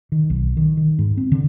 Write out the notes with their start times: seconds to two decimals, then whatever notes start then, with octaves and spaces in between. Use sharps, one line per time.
0.12 D#3
0.30 B1
0.57 D#3
0.77 D#3
0.99 G#2
1.17 C4
1.32 D3